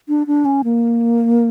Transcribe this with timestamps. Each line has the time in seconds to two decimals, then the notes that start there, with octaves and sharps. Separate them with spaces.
0.09 D4
0.27 D4
0.45 C#4
0.64 A#3